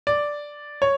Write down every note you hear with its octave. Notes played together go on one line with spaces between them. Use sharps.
D5
C#5